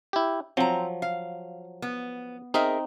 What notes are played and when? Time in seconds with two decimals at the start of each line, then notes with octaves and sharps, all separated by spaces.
0.13 E4 G4
0.57 F3 F#3 C4 A#5
1.02 F5
1.82 B3
2.54 C4 D#4 G#4 A#4 E5